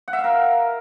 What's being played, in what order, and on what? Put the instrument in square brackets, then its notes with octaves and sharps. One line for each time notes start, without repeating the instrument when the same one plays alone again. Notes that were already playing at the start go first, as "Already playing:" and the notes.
[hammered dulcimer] F#5
E5
F5
A#4